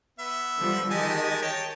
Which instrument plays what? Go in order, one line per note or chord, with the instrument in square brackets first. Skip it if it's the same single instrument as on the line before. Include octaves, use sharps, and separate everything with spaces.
[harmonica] B3 E5
[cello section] D3 F3 G3
[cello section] D#3 G4 D#5 [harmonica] G#3 G#5 A5
[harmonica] C#5 G5 A5